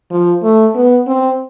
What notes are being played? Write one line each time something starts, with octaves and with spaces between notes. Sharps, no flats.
F3
A3
B3
C4